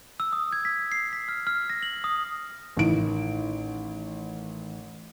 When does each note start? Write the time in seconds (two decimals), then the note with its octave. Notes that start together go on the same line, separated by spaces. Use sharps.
0.20 E6
0.33 D#6
0.53 G#6
0.65 B6
0.92 C7
1.13 B6
1.28 F6
1.47 F6
1.70 A#6
1.83 F#7
2.04 D#6
2.77 A1 D#3 D7